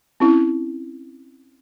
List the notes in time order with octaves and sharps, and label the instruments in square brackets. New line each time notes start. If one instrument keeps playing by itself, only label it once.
[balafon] C4 C#4 E4